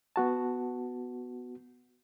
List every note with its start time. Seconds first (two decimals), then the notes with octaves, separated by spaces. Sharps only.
0.16 B3 F#4 A5